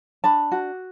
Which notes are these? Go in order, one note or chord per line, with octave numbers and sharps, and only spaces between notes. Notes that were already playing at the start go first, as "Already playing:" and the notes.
D4 A5 B5
F#4